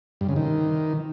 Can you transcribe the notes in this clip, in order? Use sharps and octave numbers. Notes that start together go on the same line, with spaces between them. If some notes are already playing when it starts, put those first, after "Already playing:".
G2
C#3
D#3